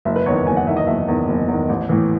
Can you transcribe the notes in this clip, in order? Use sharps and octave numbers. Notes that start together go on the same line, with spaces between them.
F#1 E5
B4
E2 D#3 C#5
C#5
F#1 G#5
F#5
E2 D#3 E5
D#5
F#1 E5
E2 D#3
F#1
E2 D#3
A1
A2 E3